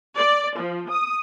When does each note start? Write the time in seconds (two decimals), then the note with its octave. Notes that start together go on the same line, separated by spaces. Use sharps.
0.16 D5
0.57 F3
0.90 D#6